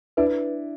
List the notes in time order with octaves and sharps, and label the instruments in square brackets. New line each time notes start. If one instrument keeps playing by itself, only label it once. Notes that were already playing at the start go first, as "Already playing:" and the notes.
[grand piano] D4 E4 [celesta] B4